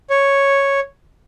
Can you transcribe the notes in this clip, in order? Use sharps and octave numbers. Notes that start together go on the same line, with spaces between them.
C#5